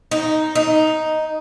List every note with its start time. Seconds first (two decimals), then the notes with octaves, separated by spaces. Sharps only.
0.11 D#4
0.55 D#4